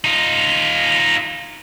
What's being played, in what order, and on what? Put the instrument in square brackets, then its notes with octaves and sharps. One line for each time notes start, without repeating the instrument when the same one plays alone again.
[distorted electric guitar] D#4 F4